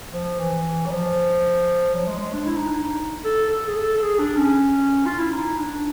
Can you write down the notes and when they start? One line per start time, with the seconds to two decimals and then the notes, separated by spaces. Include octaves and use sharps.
0.13 F3
0.39 E3
0.86 F#3
0.91 F3
1.94 F#3
2.08 G#3
2.20 G#3
2.33 D4
2.46 E4
2.57 D#4
2.68 D4
2.79 D#4
3.24 A4
3.50 A4
3.68 G#4
3.76 A4
3.97 A4
4.02 G#4
4.19 D4
4.36 C#4
5.06 F4
5.19 E4
5.32 D#4
5.58 D4